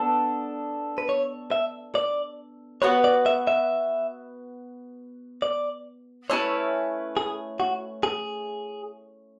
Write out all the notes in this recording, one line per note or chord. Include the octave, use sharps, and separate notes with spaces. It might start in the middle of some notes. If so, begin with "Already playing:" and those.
Already playing: B3 D4 A4
B4
C#5
E5
D5
B3 F#4 B4 C#5
D5
E5
E5
D5
A3 C#4 E4 B4 C#5
G#4
F#4
G#4